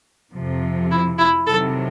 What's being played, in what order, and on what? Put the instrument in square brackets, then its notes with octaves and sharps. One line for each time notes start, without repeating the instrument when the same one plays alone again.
[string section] F2 C3 F3
[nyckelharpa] E4
E4
[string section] C3 D#3 F#3 [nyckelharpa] A4